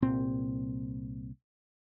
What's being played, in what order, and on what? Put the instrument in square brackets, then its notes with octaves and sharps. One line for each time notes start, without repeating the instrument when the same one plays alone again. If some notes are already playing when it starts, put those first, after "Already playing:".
[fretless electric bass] C2 A#2 C4